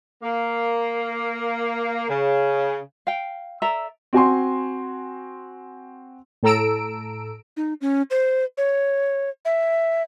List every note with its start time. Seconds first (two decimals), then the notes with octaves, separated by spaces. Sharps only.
0.22 A#3
2.08 C#3
3.07 F5 G5
3.62 A4 D5 E5 A#5
4.13 C4 F#4 G#5 C6
6.43 A2 A4 A#5 E6 D7
7.57 D#4
7.81 C#4
8.11 C5
8.58 C#5
9.45 E5